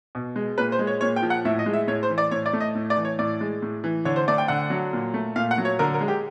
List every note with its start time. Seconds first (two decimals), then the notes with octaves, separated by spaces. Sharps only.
0.15 B2
0.36 G#3
0.58 A#2 B4
0.72 C5
0.79 G#3
0.87 C#5
1.01 A#2 C#5
1.16 G5
1.22 F3
1.30 F#5
1.45 A2 E5
1.59 D#5
1.66 G#3
1.73 E5
1.88 A2 C#5
2.03 C5
2.10 E3
2.18 D5
2.31 A2 C#5
2.46 D5
2.53 A3
2.60 D#5
2.75 A2
2.90 D5
2.97 E3
3.05 C#5
3.19 A2 D5
3.41 G#3
3.62 A2
3.84 E3
4.05 D3 C#5
4.16 C5
4.28 A3 D5
4.38 G5
4.48 D3 F#5
4.70 F#3
4.93 A#2
5.14 A3
5.36 A#2 F5
5.51 F#5
5.58 F#3
5.65 C#5
5.79 D3 A#4
5.94 A#4
6.01 G#3
6.08 G4